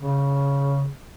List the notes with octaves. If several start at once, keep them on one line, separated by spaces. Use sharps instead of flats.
C#3